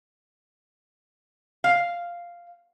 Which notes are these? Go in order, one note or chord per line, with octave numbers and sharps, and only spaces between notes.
F5